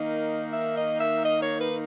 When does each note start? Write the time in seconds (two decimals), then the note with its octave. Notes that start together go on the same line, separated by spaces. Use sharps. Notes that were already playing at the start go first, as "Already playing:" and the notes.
Already playing: D#3 A#3 D#4 D#5
0.53 E5
0.77 D#5
1.01 E5
1.25 D#5
1.43 C#5
1.61 B4